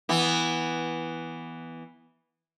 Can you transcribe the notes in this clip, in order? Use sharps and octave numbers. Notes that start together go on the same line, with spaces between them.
E3 B3